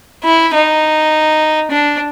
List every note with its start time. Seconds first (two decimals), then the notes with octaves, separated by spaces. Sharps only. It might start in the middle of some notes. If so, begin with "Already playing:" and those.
0.24 E4
0.54 D#4
1.71 D4